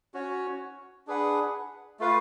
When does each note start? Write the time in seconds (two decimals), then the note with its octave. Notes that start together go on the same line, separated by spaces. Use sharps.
0.14 C#4 F#4 C#5
1.07 D4 G#4 B4 F#5
2.00 A3 F4 B4 F5